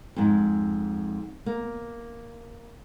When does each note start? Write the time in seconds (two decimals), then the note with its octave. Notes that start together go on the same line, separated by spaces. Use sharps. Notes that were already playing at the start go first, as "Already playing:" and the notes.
0.16 F2 G#2
1.46 A#3